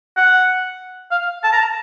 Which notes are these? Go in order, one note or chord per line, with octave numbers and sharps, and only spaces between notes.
F#5
F5
A5
A#5
A5